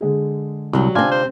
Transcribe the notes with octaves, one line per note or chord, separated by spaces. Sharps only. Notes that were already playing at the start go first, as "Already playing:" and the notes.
D3 G#3 G#4
C2 F#3 G3
C3 C4 D4 F4 G#5
C5